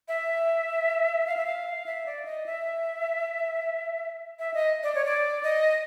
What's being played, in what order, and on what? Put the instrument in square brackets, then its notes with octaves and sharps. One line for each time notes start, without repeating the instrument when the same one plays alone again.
[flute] E5
F5
E5
F5
E5
D5
D#5
E5
E5
D#5
D5
C#5
D5
D#5